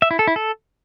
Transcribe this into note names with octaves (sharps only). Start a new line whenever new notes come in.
E5
E4
A4
E4
A4